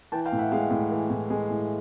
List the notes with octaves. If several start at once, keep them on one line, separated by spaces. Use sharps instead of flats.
E3 G5 A5
F5 G5
A2
E5 F#5
G#3 F5 G5
A2
E3
A2
G#3
A2